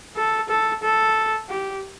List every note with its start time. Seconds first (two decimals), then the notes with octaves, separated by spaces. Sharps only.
0.16 A4
0.49 A4
0.83 A4
1.49 G4